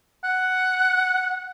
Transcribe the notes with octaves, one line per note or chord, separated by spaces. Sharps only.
F#5